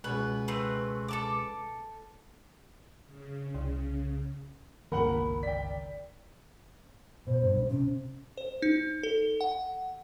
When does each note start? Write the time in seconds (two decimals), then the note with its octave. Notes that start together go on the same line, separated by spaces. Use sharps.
0.04 C#2 B2 B4
0.48 A3 C4 B4
1.08 A4 A5 D6
3.07 C#3
3.54 C2
4.92 G1 C#2 A#2 D#3 A#4 F#5 B5 F#7
5.43 D5 G5 B6
7.27 B2 C5
7.42 G2
7.54 B1
7.69 C3 C#4
8.37 C5
8.62 D#4
9.03 A4
9.41 F#5